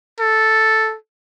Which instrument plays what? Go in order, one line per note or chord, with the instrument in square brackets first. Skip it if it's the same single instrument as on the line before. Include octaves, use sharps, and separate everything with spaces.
[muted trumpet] A4